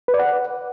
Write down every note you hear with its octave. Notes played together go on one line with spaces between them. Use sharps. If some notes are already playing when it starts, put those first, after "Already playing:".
B4
D5
F#5